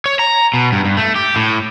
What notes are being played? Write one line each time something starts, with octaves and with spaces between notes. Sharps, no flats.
C#5
A#5
B2
G2
G2
A3
G4
A2